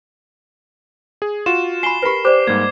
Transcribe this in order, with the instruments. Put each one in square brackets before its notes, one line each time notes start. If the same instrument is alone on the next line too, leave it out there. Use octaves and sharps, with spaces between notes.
[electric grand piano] G#4
[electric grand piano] F4 F#4 [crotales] E7
[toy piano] G#5 B5 [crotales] C7 G7
[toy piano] G4 B4 [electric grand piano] A#4 B5
[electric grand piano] G4 [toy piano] C5 D5 [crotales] D6
[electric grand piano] G#2 G3 A#3 [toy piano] D6 [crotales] G#6